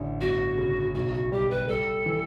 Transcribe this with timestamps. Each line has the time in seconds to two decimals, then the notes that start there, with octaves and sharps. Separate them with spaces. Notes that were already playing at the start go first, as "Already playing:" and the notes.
Already playing: A1 D3
0.21 G1 F#4
0.57 C#3
0.94 B1 F#4
1.13 F#4
1.32 G3 G4
1.50 B4
1.68 G3 A4
2.06 E3